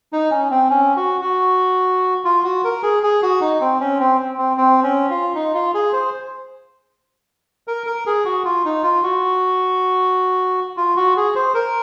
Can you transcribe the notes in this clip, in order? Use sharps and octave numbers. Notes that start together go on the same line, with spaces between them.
D#4
C#4
C4
C#4
F#4
F#4
F4
F#4
A#4
G#4
G#4
F#4
D#4
C4
C#4
C4
C4
C4
C#4
F4
D#4
F4
G#4
C5
A#4
A#4
G#4
F#4
F4
D#4
F4
F#4
F4
F#4
G#4
C5
A#4